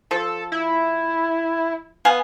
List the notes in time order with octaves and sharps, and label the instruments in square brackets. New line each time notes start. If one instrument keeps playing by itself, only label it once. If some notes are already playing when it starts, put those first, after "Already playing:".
[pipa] F3 [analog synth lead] A4
[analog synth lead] E4
[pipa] B3 F5 G#5